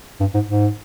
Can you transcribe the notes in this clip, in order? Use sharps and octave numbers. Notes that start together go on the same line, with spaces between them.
G2
G#2
G#2